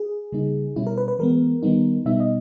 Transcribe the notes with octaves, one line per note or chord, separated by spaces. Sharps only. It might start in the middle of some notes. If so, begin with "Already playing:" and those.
Already playing: G#4
C#3 G3 A#3 D#4
B2 G3 C#4 E4
A#4
B4
B4
E3 G#3 B3 A#4
D#3 G3 B3 D#4
B2 G3 B3 D#4 E5
D#5